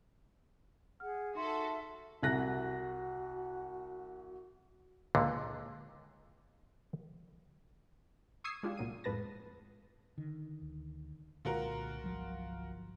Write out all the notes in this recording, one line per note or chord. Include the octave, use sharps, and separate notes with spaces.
G#4 F#5 F6
D#4 F#4 A4 E5 C6
C2 F#4 F#6 A#6
C#2 A#2 D3
C#6 D#6 E6 G#6 C7
G#3 D4 F4 G4
C2 A#2 F#3 D#7
F2 A2 G#3 B4 A5 A#6
D3 D#3
D2
C2 A#2 D3 G#3 F4 F#4 A#4
G1 F3 F#3